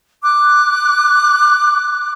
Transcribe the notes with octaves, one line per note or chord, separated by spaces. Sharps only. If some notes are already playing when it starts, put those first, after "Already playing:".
D6 F#6